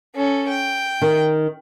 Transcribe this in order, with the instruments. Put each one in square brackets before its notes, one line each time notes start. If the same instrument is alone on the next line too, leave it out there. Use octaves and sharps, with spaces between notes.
[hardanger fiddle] C#4 A4
G5
[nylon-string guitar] D#3